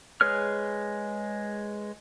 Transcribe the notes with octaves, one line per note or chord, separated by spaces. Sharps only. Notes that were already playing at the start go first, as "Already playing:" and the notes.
G#3 G#4 B4 C#5 F6